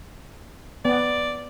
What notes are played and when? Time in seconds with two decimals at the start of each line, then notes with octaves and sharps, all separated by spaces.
0.85 B3 D5